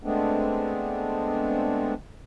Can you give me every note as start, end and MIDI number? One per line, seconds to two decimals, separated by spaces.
0.03 1.94 56
0.03 1.94 57
0.03 1.94 59
0.03 1.94 60
0.03 1.94 62